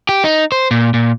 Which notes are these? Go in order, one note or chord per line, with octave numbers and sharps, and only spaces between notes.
G4
D#4
C5
A#2
A#2